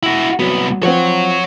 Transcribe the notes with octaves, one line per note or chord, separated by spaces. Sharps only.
E4 F#4
C2 F#3 B3
F3 C4 C#5 F#5